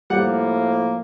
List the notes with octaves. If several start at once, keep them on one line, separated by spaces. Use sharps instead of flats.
A2 F3 G3 A#3 F#5